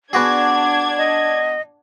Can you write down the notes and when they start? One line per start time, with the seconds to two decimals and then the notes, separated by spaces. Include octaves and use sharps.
0.13 B3 D4 F#4 G#4 D6 G#6
0.98 D#5